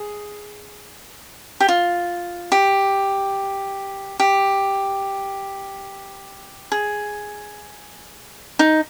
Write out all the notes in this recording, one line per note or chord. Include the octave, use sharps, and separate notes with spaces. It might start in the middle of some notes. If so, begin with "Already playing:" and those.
Already playing: G#4
G4
F4
G4
G4
G#4
D#4